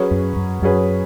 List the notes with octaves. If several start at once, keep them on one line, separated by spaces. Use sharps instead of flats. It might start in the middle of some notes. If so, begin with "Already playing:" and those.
Already playing: F#3 C#4 G#4 B4
F#2
F#2
F#2 F#3 C#4 G#4 B4